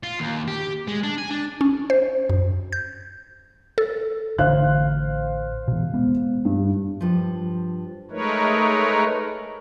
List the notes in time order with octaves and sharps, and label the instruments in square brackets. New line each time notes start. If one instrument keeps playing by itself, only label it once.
[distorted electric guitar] F4
D#2
G4
G#3
D4
G#5
D4
[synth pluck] C#4
C5
F#2
G6
A4
[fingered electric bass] A1 D3 [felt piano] C5 F5 F#6
[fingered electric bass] B2 E3
G#3 B3
[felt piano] G2
[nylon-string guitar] G2 F3
[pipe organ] G#3 A3 D#4 A#4 B4 C#5